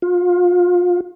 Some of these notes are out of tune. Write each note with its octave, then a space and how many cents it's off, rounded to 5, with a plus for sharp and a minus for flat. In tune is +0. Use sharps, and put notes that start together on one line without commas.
F4 +30